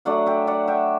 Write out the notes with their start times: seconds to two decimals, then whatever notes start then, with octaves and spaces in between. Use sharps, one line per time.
0.05 F#3 A3 D4 D5 F#5
0.26 E5 G5
0.47 D5 F#5
0.67 E5 G5